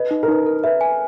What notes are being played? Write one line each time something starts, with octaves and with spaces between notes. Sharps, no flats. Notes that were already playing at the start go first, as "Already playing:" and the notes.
Already playing: B4 D#5
D#4
A#4
D#4 B4
A#4
B4 E5
G#5